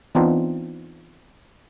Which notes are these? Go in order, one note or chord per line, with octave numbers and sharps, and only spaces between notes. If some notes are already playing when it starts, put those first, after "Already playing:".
E3 B3 C4 D4 D#4 F4